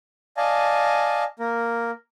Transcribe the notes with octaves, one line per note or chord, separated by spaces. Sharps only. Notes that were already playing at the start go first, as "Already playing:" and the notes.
D5 D#5 F5 G#5 A5
A#3 A#4